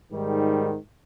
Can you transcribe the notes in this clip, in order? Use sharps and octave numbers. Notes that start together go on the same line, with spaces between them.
G#2 D#3 G3